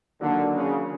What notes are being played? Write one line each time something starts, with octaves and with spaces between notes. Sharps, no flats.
D3 D#3 F#3 A#3 D4 F#4
C#3